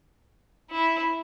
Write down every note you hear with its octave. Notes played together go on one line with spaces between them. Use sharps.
E4